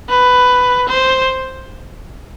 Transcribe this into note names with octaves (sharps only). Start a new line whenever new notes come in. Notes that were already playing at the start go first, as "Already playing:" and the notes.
B4
C5